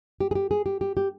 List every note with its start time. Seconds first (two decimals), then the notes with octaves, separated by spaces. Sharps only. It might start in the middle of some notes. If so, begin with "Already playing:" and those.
0.20 G4
0.31 G#4
0.35 G4
0.51 G#4
0.66 G4
0.81 G4
0.97 G4